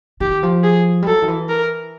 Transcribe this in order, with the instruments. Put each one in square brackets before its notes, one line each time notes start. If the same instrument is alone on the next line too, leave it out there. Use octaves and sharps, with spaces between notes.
[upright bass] D#3 [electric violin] G4
[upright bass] F3
[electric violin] G#4
[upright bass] G3
[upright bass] F#3 [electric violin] A4
[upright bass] D#3
E3
[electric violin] A#4